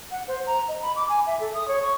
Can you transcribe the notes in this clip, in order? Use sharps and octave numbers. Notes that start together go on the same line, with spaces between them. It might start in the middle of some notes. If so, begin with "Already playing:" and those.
F#5
C5
A#5
D#5
B5
D6
G#5
E5
A4
D#6
C#5
C#6